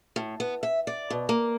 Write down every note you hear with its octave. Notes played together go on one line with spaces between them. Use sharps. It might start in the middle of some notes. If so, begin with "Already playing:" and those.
A2
B3
E5
D5
B2
A#3